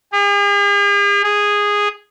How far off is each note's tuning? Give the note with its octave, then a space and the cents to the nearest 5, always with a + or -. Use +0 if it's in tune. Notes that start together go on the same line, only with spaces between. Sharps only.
G#4 -45
G#4 -10